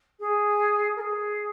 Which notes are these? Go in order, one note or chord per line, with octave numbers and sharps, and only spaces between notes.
G#4
A#4
G#4